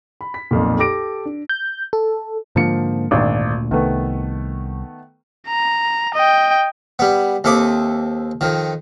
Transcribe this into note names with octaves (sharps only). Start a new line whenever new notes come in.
B5
B6
B1 F2 A#2
G4 A4 D6 A#6 D7
D4
G6
A4
G#2 D3 F3 A#3 C#7
G#1 D2 A#2 D4
C2 D#3 A3 B3
A#5
D#5 G5
G3 B3
D#2 C4 A4 E5 D6 D#6
F2 D#3